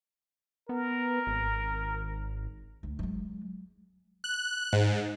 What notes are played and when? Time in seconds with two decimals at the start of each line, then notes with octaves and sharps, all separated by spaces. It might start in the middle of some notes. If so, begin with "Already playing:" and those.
0.69 B3 A#4
1.27 G#1
2.83 D2
2.99 F#3 G#3
4.24 F#6
4.73 G#2